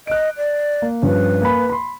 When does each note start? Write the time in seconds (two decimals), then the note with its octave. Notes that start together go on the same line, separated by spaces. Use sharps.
0.07 D#5 F#6 D7
0.37 D5
0.82 A#3
1.02 G2 F3 C#4 B4
1.41 A#3 G#5 B5
1.70 B5 C6